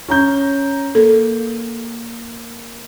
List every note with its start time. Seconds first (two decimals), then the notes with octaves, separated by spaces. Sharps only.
0.08 C#4 A#5 G6
0.95 A#3 A4